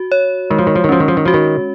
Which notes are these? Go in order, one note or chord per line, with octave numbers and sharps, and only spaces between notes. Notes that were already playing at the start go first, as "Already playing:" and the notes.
Already playing: F#4
C#5
D#3 G#3
F3
D#3
F3
D#3
F3 C#4
D#3
F3
D#3
F3 F#4
D#3